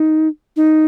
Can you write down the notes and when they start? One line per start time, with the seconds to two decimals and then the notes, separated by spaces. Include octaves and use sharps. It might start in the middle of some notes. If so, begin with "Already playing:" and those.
Already playing: D#4
0.56 D#4